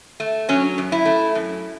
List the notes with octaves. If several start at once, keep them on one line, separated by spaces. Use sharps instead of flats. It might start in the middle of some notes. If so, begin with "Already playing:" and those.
A3
F#3 C#4
F#2
E4
A3
F#2